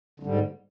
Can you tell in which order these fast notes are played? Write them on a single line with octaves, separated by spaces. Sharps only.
D3 G3 G#2